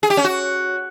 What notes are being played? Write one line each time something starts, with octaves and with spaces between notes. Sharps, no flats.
G#4
G4
C#4
F#4